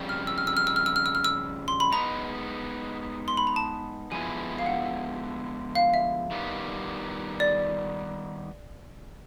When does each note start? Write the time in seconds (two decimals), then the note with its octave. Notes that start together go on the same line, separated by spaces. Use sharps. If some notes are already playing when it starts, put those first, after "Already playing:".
Already playing: F2 C#3 G3
0.09 F6
0.27 E6
0.38 F6
0.47 E6
0.57 F6
0.67 E6
0.76 F6
0.86 E6
0.96 F6
1.06 E6
1.15 F6
1.24 E6
1.68 C6
1.80 B5
1.92 G#3 B3 D#4 A#5
3.28 C6
3.37 B5
3.47 A#5
3.56 A5
4.11 D3 F3 G#3 B3 E4 G#5
4.59 F5
4.66 F#5
5.75 F5
5.94 E5
6.31 D#3 G3 B3
7.40 D5